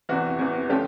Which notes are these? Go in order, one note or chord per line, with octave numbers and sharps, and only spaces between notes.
E2 C3 E3 F#4
E2 C3 E3
D3 F3 A3 C#4 G4